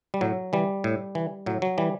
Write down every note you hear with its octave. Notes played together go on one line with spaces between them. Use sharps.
G3
A2 F#3
E3 G3
A2
E3
A2 F#3
F#3
E3 G3